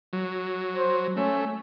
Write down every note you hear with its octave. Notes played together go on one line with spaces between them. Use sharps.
F#3
C5
A3 C#4